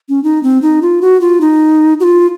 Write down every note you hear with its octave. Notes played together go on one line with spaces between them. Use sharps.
C#4
D#4
C4
D#4
F4
F#4
F4
D#4
F#4
F4